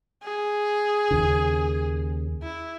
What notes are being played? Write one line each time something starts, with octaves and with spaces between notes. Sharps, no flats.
G#4
D#2 C#3
E4